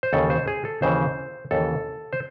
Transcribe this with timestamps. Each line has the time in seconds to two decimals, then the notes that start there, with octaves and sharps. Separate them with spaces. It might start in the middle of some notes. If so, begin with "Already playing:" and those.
0.03 C5
0.13 D#2 C#3 E3 A4
0.30 C5
0.48 G#4
0.65 A4
0.82 D#2 C#3 E3 C5
1.51 D#2 C#3 E3 A4
2.13 C5